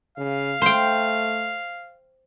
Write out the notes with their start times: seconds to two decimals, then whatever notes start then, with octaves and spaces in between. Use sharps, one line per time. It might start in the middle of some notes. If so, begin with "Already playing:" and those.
0.18 C#3 F5
0.62 A3 C5 G5